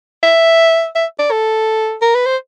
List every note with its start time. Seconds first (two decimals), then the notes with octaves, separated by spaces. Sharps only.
0.23 E5
0.95 E5
1.19 D5
1.32 A4
2.02 A#4
2.15 B4
2.26 C5